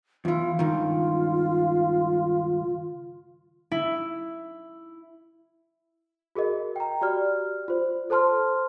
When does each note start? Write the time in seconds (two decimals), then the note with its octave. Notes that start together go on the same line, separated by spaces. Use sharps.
0.25 E2 E3 F4
0.59 C#2 G2 D#3 F4
3.71 E4
6.35 F#4 G#4 A#4 D#5
6.76 G5 A#5
7.01 F#4 G4 D5 F6
7.68 F4 C5
8.10 A4 C5 A5 C6 F6